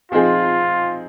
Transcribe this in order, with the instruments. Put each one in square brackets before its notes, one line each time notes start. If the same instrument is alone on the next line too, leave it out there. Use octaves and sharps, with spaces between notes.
[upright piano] F3 C4 D#4 G#4 [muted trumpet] F4